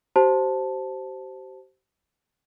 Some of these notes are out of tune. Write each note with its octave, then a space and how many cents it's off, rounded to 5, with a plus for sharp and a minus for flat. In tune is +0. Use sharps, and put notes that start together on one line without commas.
G4 -40 C5 +0 A5 +0